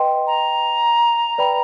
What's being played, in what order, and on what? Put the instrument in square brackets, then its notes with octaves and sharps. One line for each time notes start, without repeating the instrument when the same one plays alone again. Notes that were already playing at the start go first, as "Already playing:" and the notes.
Already playing: [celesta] B4 D#5 G5 C6
[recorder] A#5
[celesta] B4 D5 G5 B5